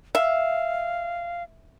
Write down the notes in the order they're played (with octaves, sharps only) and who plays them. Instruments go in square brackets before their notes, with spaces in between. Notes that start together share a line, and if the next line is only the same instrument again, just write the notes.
[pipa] E5 [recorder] F5